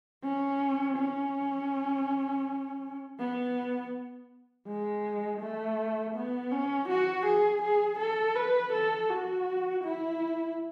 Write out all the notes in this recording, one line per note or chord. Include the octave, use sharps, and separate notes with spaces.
C#4
C#4
B3
G#3
A3
B3
C#4
F#4
G#4
G#4
A4
B4
A4
F#4
E4